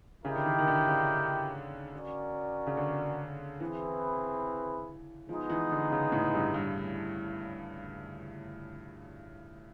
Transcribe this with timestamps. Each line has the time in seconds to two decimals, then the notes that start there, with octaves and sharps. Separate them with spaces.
0.24 C#3 E4 G4 A#4 D#5 G5
0.36 D3
0.46 D#3
0.58 D#3
0.67 D3
0.88 C#3
1.93 C#4 F#4 A#4 D5
2.67 C#3
2.77 D3
3.60 E3 C4 E4 G#4 B4
5.29 F3 G#3 B3 D#4
5.50 E3
5.71 D3
5.92 C#3
6.12 A2
6.34 G2
6.54 G2